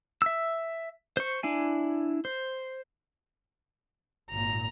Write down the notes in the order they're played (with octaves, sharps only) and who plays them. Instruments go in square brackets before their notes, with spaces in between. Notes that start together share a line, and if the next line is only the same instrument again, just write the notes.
[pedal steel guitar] E5 E6
C5 C#6
D4 E4 G#5
C5
[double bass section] G#1 A#2 [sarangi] A#5